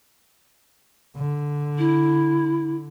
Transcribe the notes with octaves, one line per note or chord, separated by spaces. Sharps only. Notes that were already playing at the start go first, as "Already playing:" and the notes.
D3
E4